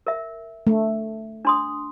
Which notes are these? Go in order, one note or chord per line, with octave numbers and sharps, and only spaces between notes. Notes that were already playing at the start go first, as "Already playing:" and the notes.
A#4 E5
A3
D4 C6 D#6